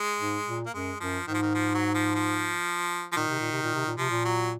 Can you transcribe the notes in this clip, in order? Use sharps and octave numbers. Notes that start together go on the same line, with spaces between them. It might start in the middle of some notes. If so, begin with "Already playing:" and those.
Already playing: G#3
G#2
A#2
A#3
F#2 G#3
F#2 F3
G#2 D#3
F3
D#3
F3
F#3
F3
F3
F3
A#2 D#3
C3
A#2
C3
A#2
C3
A#2
C3 F3
A#2
F#3